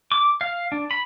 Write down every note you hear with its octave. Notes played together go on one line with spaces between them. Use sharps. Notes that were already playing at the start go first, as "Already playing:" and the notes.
D6
F5
D4
B5